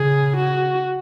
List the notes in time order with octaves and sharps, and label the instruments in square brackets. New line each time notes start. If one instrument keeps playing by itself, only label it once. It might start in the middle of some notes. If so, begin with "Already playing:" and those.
Already playing: [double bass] C#3 [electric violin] G#4
[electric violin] F#4